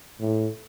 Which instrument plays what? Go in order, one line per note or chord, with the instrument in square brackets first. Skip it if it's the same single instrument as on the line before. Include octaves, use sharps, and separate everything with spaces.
[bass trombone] A2